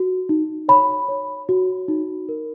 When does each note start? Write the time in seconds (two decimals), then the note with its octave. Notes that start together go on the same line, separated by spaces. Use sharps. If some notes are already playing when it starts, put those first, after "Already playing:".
Already playing: F#4
0.29 D#4
0.68 C#5 B5
1.09 C#5
1.49 F#4
1.88 D#4
2.29 A#4